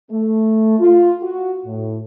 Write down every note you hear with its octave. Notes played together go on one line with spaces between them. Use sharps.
A3
F4
F#4
A2